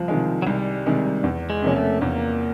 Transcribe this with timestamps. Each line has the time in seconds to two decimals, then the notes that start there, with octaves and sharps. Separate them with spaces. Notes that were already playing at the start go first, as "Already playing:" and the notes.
Already playing: C2 F3
0.08 C3 D#3 G#3
0.42 F#3
0.47 C2 G3
0.86 C3 D#3 G#3
1.24 E2
1.50 G#3
1.62 C3 F3 A#3 C#4
1.76 A3
2.01 E2 A#3